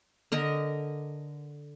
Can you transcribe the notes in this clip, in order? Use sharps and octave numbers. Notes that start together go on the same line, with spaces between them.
D3 A#4 D#5